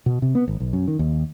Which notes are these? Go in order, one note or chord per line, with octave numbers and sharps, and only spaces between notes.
B2
C3
B3
G#1
B1
F#2
D#3
D#2